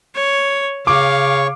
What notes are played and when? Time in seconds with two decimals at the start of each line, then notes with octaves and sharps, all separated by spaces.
0.16 C#5
0.87 C#3 C#5 F5 C#6 D6